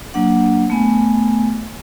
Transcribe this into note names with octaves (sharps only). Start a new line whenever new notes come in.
F#3 A#3 D4 F#5
A3 B3 G#5